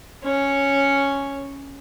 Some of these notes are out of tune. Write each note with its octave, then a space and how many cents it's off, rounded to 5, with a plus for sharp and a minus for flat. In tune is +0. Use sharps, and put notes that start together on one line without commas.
C#4 +0 C#5 +0